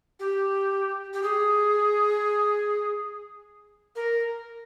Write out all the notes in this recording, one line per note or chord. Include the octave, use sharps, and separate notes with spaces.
G4
G4
G#4
A#4